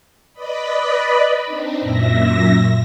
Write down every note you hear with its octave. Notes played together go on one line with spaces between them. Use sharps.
B4 D5 D#5 B5
C4 D4 D#4
F#2 A#2 E5 A#6